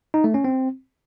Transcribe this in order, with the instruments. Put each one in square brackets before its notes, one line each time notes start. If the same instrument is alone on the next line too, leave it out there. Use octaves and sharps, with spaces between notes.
[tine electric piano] D#4
A3
C#4
C4